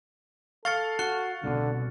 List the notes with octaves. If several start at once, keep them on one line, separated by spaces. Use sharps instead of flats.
A4 F5 C#6 F6 A6 C#7
F#4 C#6 F#6 C#7
C2 B2 D3